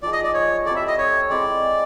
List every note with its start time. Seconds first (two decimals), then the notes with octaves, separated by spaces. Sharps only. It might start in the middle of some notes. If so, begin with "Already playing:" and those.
0.03 F3 A#3 D#4 G#4 D5
0.13 D#5
0.24 D5
0.34 C#5
0.66 G3 C4 E4 A4 D5
0.76 E5
0.87 D#5
0.98 C#5
1.30 G#3 C4 E4 D5